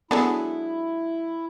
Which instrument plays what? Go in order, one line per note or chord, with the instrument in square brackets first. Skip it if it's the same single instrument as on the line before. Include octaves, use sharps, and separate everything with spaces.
[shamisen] F#3 G#3 D4 [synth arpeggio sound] B3 A4 [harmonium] E4